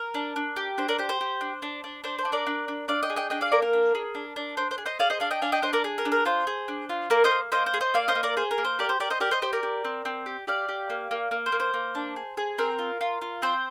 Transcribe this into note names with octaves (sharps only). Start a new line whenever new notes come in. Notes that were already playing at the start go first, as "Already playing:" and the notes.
Already playing: A#4
D4
D4
G4
D4 C5
A#4 D5
G4 C5
C5
G4
D4
D4
D4
D4 C5
C5
D4
A#4 D5
D4
D4
D4 D5 F5
D#5 G5
G#4
D#5 G5
D4 D#5 G5
D5 F5
A#3 A#4 D5
A#4
D4
G#4
D4
D4
D4 C5
C5
G#4
C5 D#5
G#4 D5 F5
C5 D#5
D4 D5 F5
D#5 G5
D4 F5 G#5
D#5 G5
D4 C5 D#5
A#4 D5
G#4
A#4
D4
A#4
F4 C5
G#4
D4
F4
A#3 A#4 D5
C5 D#5
A#3
A#3 C5 D#5
C5
G#4
C5 D#5
A#3 D5 F5
C5 D#5
A#3
A#4 D5
G#4 C5
A#4
A#3
C5
G4 A#4 D5
C5
G4 A#4 D5
C5 D#5
G4 A#4 D5
C5 D#5
G4 C5
A#4 D5
G4
C4
C4
G4
G4 D5 F5
G4
A#3
A#3
A#3
C5
A#3
C5
A#3
D4
G#4
G#4
C4 A#4
F4
F4
F4
C4 C5